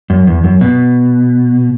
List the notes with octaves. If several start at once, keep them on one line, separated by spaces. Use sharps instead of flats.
F#2
E2
F#2
B2